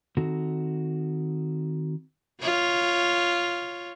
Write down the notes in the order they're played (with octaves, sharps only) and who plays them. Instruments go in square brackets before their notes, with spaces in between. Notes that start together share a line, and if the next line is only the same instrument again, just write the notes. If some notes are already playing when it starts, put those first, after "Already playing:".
[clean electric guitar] D#3 C4 D#4 F#4 A4
[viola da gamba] F4 C#5